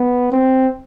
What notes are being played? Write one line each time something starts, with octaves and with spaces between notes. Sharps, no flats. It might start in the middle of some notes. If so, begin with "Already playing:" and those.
Already playing: B3
C4